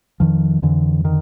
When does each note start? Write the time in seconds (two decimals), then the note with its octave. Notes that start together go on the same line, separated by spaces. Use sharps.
0.20 F2 D#3 F3
0.62 F2 D3 E3
1.04 D3 D#3